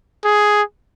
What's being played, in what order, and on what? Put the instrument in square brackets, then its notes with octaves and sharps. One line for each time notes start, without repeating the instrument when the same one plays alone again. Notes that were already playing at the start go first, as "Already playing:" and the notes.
[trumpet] G#4